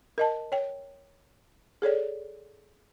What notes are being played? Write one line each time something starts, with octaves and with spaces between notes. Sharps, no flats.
A#4 D#5 A5
C#5 G5
G#4 A4 C#5 D5